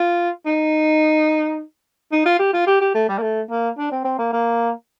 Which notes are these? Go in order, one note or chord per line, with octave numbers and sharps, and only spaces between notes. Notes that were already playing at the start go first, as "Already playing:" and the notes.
Already playing: F4
D#4
D#4
F4
G4
F4
G4
G4
A3
G3
A#3
A3
A#3
D4
C4
C4
A#3
A#3